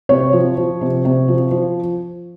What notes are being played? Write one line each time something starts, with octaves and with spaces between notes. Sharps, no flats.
C3 C#5
F3
F3
C3
C3
F3
F3